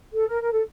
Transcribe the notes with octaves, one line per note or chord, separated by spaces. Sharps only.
A4
A#4
A#4
A4